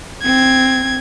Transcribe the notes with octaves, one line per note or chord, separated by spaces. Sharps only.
C4 G#6